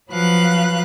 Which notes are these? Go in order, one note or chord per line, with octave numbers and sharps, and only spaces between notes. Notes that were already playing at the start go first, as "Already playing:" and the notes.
F3 F#3 B4 F5 F#6